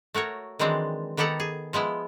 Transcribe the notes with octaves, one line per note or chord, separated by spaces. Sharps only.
A3 F#4 A#4 C#5
D#3 E3 F#3 G#3 C4 D4
D#3 B3 G4 A4 F#5 A#5
G#4
F3 G#3 B3 E4